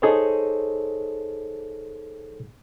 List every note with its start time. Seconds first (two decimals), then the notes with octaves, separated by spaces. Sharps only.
0.02 D#4 G#4 A4 C5 C#5